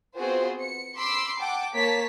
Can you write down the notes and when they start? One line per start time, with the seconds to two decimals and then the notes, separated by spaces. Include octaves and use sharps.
0.18 B3 C4 F4 F#4 G#4 C5
0.60 C#7
0.98 B5 C6 D6 E6 C7
1.38 F#5 G5 A5 D6
1.75 A#3 C#5 A5 B6